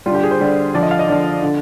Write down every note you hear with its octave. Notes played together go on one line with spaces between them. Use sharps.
D3 G3 F4 G4
G#4
C5
D3 G3
D3 F3 D5
D#5
F5
D#5
D3 F3 D5
D3